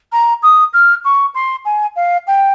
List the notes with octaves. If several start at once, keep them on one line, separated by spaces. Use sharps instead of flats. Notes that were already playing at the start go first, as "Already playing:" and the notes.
A#5
D#6
F6
C#6
C6
G#5
F5
G5